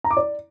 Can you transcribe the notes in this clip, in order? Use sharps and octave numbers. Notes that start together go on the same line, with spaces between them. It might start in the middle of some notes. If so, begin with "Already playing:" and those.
A#5
D6
D5